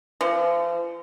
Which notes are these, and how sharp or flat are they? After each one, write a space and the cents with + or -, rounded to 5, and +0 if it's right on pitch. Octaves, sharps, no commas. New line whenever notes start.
F3 -40